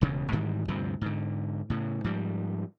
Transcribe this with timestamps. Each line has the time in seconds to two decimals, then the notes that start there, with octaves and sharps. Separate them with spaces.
0.01 E1 D2 C#3
0.32 G#2 D#3 E3 G3
0.68 D2 G2 C3 F3
1.01 G#2 D3
1.70 A2 C#3
2.04 G#2 F3 G3